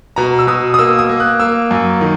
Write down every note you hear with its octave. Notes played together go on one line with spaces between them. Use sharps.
B2 A#5
E6
B2 D#6
D#6
A#3 E6
D#6
A#3
F#6
A#3 E6
F#2
D#3